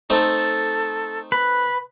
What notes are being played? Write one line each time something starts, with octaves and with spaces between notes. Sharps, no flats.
A3 C4 D#4 A4
B4